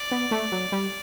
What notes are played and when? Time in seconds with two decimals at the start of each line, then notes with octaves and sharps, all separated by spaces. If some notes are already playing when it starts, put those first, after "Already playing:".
Already playing: D5
0.11 B3
0.31 A3
0.52 F#3
0.72 G3